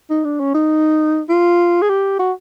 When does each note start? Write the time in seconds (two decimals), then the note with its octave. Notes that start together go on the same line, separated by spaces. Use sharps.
0.10 D#4
0.25 D4
0.40 C#4
0.54 D#4
1.29 F4
1.82 G#4
1.89 G4
2.19 F#4